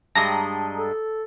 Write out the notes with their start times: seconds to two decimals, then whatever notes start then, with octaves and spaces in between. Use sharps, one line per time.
0.15 G2 G3 G#3 A5 A#5 D#6 A#6
0.77 A4